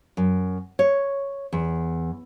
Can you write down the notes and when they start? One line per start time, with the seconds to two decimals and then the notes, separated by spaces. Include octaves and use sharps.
0.17 F#2
0.79 C#5
1.53 E2